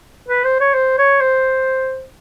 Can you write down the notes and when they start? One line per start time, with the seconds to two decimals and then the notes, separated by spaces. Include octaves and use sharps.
0.28 B4
0.44 C5
0.60 C#5
0.74 C5
0.98 C#5
1.21 C5